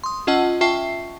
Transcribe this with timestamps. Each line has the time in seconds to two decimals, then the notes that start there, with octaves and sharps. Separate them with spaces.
0.04 C6 D#6
0.27 C#4 F4 D#5 F#5 A5 E6
0.61 F4 E5 G5 A5 C#6 C7